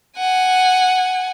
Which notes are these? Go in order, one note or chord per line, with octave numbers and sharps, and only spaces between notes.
F#5 G#5